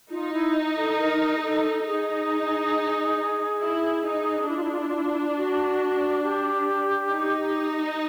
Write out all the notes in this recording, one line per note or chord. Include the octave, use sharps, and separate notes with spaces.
D#4 F4
E4
A4
A#4
G#4
A4
D#4 G#4
E4
D#4
D4 E4
F4
E4
F4
E4
F4
E4
F4
E4
F4
E4
F#4
G4
D#4